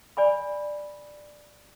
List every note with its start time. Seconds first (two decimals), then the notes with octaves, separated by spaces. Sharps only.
0.17 D5 G#5 B5